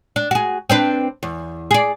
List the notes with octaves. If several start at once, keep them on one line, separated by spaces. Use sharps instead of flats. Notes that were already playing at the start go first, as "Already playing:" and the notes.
D4
F#4 G#4
C4 D4 B4
E2
G#4 D5